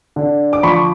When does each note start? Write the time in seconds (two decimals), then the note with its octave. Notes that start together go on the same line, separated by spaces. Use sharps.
0.16 D3
0.53 D6
0.63 F3 B5 C#6